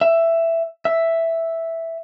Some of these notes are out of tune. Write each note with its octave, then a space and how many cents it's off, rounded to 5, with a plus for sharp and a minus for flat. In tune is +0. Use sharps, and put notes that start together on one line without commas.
E5 +10
E5 +0